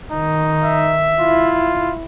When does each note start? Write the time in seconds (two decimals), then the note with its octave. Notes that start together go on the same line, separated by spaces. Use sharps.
0.12 D#3 D#4
0.64 E5
1.20 E4 F4